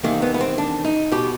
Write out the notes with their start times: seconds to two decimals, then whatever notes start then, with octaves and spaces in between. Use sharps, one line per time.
0.03 E2 C3 D#3 A#3
0.22 B3
0.34 B3
0.41 C4
0.58 D4
0.85 D#4
1.12 B2 G4